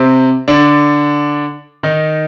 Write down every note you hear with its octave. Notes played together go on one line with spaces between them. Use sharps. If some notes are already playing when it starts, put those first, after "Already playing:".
Already playing: C3 C4
D3 D4
D#3 D#4